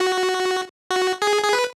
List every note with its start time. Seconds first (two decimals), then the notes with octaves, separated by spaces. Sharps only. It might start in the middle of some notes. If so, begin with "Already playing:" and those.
Already playing: F#4
0.91 F#4
1.22 G#4
1.43 G#4
1.53 B4